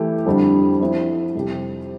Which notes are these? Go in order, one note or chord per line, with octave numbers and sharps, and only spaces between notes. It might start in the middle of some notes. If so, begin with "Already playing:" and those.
Already playing: E3 A3 E4 G4
F2 D3 G3 D4
F3 C4 E4
F2 C3 G3 C4 G4